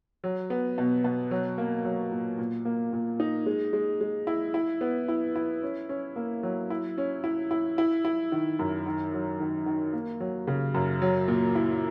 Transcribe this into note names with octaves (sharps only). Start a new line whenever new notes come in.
F#3
B3
B2
B2
F#3
A#3
F#3
A#2
A#2
A#3
A#2
D#4
G#3
G#3
G#3
E4
E4
B3
E4
E4
C#4
C#4
A#3
F#3
E4
C#4
E4
E4
E4
E4
D#3
F#2
D#3
F#3
D#3
D#3
A#3
F#3
C#3
F#2
F#3
A#2
E4